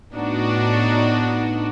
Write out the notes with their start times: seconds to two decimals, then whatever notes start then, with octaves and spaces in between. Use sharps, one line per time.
0.14 A2 B3 D4 D#4 F#4